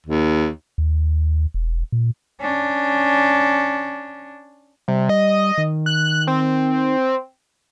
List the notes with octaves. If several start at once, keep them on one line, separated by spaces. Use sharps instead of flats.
D#2
D#2
E1
A#2
C#4 D4
C3 G3
D#5
D#3
F#6
C4